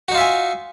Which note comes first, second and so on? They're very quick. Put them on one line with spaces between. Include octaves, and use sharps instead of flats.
F#4 D#4 F4 E5 G#5